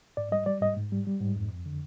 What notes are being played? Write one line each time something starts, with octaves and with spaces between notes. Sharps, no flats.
G#2 D5
G3 D#5
G3 D5
G#2 D#5
G#2
G3
G3
G#2
F2
F2
D3